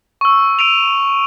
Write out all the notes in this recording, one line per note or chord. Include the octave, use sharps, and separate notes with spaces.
C#6 E6
E6 D7 D#7 F7